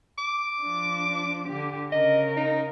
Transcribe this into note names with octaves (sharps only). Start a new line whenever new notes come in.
D6
F3 D4
D3 G4
C#3 A#4 D#5
D#4